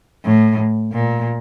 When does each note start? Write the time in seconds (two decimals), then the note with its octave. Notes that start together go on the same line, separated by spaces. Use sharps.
0.25 A2
0.93 A#2